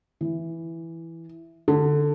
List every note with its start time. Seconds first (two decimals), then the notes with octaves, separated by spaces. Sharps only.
0.21 E3
1.68 D3